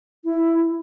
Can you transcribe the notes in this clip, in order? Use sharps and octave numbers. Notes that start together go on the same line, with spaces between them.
E4